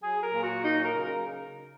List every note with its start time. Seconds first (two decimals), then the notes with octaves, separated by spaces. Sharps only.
0.02 F#3 G#4
0.23 A#4
0.33 A#2
0.43 F#4
0.63 F#3 D#4
0.84 A#4
0.94 C#3
1.04 A#4